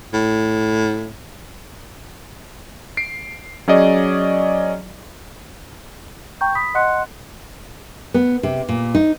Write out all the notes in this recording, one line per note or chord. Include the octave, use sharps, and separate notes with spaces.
A2
C7 D7
F#3 C#4 G#4 D5 D#5
G5 A#5 C#6 G6
B5 D#6 B6
D#5 F#5 C6 F#6 C#7
B3
C3
A#2
D#4